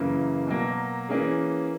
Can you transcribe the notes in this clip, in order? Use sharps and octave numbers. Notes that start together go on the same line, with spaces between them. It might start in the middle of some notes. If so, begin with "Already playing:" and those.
Already playing: F#2 C#3 E3 A#3
B2 F#3 A#3
E3 A#3 C#4 G#4